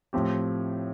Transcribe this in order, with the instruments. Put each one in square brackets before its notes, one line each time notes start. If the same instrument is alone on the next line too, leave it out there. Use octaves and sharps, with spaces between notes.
[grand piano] A2 F3 C4 G4